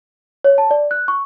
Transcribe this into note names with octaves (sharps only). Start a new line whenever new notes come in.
C#5
A5
D5
F#6
C#6